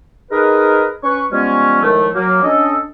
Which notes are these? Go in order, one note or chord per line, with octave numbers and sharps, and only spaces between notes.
D#4 G#4 A#4 B4
C#4 B4 C#6
F3 G3 G#3 B3 C#4
A2 D#3 F3 G#3 A3
F#3 A#3
C#4 D4 A4 D#5